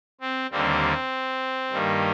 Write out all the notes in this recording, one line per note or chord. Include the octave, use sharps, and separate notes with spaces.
C4
D#2 D3 G3 A#3 C4
G2 D#3 G3 A#3